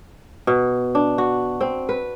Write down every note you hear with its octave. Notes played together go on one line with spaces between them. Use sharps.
B2
D4
F#4
C4
B4